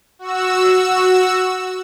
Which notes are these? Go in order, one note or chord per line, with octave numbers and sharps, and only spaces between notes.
F#4 E6